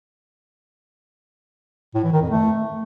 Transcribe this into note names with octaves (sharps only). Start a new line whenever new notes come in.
A2
E3
D#3
F2
A3